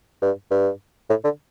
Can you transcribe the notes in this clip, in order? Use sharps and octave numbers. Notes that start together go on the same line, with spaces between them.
G2
G2
A2
D3